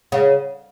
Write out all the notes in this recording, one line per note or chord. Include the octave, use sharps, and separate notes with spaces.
C#3